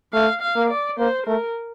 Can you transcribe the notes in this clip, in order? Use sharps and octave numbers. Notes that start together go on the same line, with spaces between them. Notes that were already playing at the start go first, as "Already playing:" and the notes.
A3 F5
F5
A#3
D5
A#3 C5
A3 A#4